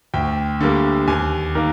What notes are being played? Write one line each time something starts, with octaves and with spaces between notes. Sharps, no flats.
D2 G5
D3 G3 A#3
D#2 G#5
D#3 A#3 A#4